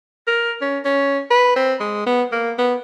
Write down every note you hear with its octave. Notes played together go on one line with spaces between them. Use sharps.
A#4
C#4
C#4
B4
C4
G#3
B3
A#3
B3